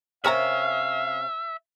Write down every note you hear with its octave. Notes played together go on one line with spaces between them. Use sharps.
C3 C#4 A#4 C#5 E5 F5 A#5